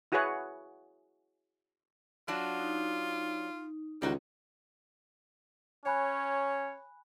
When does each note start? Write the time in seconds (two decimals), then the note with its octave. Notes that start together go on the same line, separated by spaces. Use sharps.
0.12 E4 F#4 G#4 B4 C#5 F#5
2.28 F#3 D4 F4 F#4
2.59 D#4
4.02 C#2 D#3 G3 D#4 F#4
5.86 C#4 C#5 G#5 B5 F#6